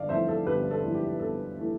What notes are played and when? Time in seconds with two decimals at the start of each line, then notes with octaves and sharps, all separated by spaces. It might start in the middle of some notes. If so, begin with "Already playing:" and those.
Already playing: G1 D5 F5
0.09 F2 E3 A3 C5 E5
0.28 A4 C5
0.46 G1 G4 B4
0.71 A4
0.82 F2 E3 A3
0.94 G4
1.19 G1 A4
1.58 E3 A3